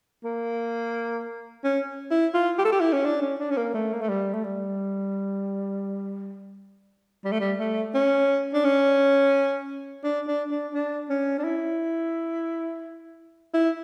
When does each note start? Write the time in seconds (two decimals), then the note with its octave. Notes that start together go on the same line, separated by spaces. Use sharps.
0.24 A#3
1.64 C#4
2.11 E4
2.34 F4
2.58 G4
2.65 A4
2.72 G4
2.80 E4
2.93 C#4
3.05 D4
3.21 C#4
3.40 D4
3.50 C#4
3.57 A#3
3.74 A3
3.93 A#3
4.01 A3
4.09 G3
4.33 A3
4.44 G3
7.24 G3
7.32 A3
7.40 G3
7.59 A3
7.94 C#4
8.54 D4
8.64 C#4
10.04 D4
10.27 D4
10.51 D4
10.74 D4
11.09 C#4
11.39 D4
11.44 E4
13.54 E4